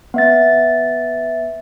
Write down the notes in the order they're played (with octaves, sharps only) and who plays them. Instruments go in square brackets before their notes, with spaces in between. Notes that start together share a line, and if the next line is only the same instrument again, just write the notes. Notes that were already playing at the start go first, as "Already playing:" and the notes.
[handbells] B3 E5 A6